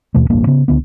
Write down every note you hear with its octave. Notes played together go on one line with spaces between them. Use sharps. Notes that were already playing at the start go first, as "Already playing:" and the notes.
D#2 B2 E3 A3
D1 A1 G2 A#3
C#3 B3
C#2 D3 B3